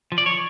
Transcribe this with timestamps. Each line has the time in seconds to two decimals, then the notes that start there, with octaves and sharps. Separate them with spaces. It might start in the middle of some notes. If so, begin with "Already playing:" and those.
0.12 F3
0.18 D5
0.26 C#5